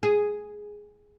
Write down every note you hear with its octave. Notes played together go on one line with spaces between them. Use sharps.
G#4